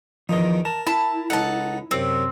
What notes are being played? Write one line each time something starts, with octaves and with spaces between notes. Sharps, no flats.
E2 D#3 F3 D#4 D#5
A#4 A5
E4 A5 B5
C#2 D#4 A4 F#5 A5
F#2 C3 C4